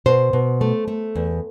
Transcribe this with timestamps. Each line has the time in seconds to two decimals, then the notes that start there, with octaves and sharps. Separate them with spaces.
0.06 B2 C5
0.33 B2
0.61 A3
0.88 A3
1.15 E2